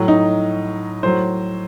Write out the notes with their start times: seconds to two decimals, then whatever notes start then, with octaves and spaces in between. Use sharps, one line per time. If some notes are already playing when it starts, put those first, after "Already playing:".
Already playing: A2 F#3
0.08 D#4
1.03 A2 F#3 C5